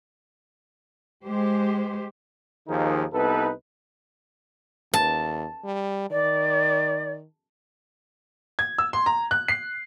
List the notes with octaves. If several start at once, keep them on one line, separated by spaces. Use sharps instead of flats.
G#3 G4 C5
D#2 D#3 F3 D#4 G#4 A#4
C2 B3 D#4 A4 B4
D#2 A5
G3
D#3 D5
G#6
E6
C6
A#5
F#6
C7